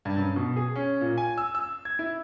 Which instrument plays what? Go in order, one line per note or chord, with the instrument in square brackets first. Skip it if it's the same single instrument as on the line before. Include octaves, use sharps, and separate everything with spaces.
[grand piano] G2
F#2
B2
G#4
C#4
A#2
G#5
E6
E6
G#6
E4